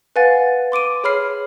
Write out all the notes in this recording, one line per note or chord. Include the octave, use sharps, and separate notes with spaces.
B4 F5 F#5 G#5 A6
C6 D6 D7 D#7
G#4 C#5 B5 F6 C7